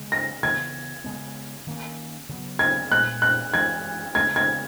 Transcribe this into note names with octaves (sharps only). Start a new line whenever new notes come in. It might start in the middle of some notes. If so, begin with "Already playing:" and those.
Already playing: C#3 G#3 B3
A#6
C#3 E3 B3 G#6
C#3 G#3 B3
D#3 A#3 C#4
C#3 F#3 B3
G#6
A#2 G#3 B3 F#6
F#6
E3 G#3 C#4 G#6
C#3 G#3 B3 G#6
G#6